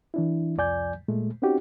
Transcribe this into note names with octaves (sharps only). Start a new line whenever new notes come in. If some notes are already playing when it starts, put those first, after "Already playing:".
E3 D4 E4
C2 F2 F3 D5 G#5 G6
A#2 G#3 A3
C4 C#4 D#4 F#4 G4